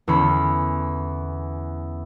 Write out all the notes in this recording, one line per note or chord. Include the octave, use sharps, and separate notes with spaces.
E2 D3 C#4 B5